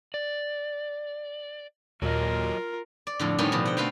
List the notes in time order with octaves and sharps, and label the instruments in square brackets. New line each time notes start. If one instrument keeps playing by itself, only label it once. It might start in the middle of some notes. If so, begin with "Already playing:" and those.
[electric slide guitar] D5
[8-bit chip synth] D#2 A#2 [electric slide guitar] F#3 D#5 [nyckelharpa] F4 A#4
[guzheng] D5
F2 A2 D3
A2 D#3 G3 B3 C#4 D#4
B2 D3 F3
F#5 G5
A3 C4 B4 F5 G5